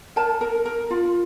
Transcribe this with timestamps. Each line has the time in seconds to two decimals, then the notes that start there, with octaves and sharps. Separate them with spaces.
0.16 A#4 A5
0.41 A#4
0.66 A#4
0.90 F4